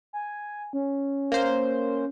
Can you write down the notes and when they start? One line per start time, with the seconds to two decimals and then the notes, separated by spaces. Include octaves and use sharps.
0.13 G#5
0.73 C#4
1.32 A#3 C5